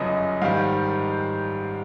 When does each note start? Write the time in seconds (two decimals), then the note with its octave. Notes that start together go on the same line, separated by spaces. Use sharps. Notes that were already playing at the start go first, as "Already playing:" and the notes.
Already playing: G1 F#2 C#3 D#5
0.41 G#2 D#3 G3 F5